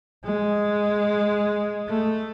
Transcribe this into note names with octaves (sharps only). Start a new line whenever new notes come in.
G#3
A3